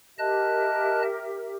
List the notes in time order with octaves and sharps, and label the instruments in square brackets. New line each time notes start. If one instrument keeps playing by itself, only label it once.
[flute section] G4 A#4 E5 [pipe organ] D#5 A5 F#6